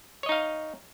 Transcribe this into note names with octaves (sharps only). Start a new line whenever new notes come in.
D#4 C#5 D#5 F5